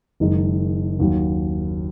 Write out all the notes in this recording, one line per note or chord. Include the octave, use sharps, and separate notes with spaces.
F#1 F#2 D#3 G#3 D#4
D#2 D#3 F#3